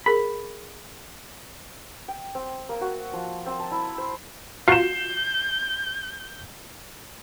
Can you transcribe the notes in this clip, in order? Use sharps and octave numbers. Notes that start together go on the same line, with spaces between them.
G#4 A#4 B5
G5
C4
A#3
F#4
F3
C4
A5
E4
C5
F4 F#4 G6 C7 E7